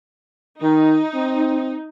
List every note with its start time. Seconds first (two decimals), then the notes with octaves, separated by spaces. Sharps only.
0.62 D#3 D#4
1.14 C4